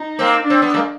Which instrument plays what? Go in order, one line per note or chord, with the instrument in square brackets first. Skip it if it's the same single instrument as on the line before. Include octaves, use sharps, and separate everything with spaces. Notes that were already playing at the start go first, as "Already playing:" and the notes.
Already playing: [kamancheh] D#4
[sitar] A#3 C4
[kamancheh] D4
[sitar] C4
B3
G#3 A#3